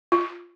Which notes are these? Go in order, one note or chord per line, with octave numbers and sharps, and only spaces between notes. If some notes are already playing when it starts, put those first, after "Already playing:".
F4